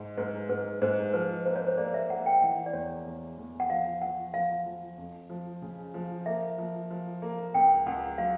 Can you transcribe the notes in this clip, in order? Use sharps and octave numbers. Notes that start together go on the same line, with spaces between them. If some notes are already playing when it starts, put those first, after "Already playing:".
Already playing: G#2
G#2 B4
G#2 B4
G#2 C5
F3 B4
A#3 C5
C#5
C5
A#3 D5
E5
A#3 F#5
G5
E3 F#5
D5
E2 C#5
E2
E2
F#5
F3 F5
F3 F#5
F3 F5
F3
F2
F3
C#3
F3
A#3 E5
F3
F3
A#3
C#2 G5
C#2 F#5
F#3 F5